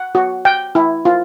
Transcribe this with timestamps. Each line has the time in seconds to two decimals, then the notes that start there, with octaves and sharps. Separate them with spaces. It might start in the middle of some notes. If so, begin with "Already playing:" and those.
Already playing: F#5
0.15 F#4
0.45 G5
0.75 E4
1.05 F4